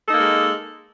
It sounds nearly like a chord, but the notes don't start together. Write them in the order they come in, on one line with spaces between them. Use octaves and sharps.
A4 D#4 A#3 G#3